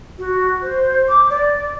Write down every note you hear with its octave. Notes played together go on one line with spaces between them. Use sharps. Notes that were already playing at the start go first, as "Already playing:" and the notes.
F#4
C5
D6
D5